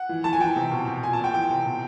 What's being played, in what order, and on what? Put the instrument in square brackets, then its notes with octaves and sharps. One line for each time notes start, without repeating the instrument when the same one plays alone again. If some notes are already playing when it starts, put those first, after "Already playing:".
Already playing: [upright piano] F#5
E3
E3 A5
G#5
E3 G5
C3
B2
B2
A#2 G#5
A5
A#2 G5
E3 G5
C3
B2